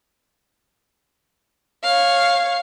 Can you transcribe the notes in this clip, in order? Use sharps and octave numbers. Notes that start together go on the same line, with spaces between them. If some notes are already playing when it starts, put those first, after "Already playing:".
C#5 F5